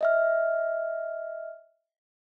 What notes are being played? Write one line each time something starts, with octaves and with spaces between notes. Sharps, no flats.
D#5 E5 F6